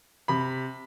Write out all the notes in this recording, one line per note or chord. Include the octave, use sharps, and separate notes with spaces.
C3 B5